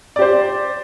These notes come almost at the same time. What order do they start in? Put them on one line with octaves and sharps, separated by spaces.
D5 G4 C5